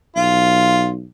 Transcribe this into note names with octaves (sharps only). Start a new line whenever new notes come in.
B1 F4